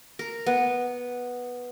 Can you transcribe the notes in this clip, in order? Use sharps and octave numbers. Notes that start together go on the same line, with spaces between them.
A#4
B3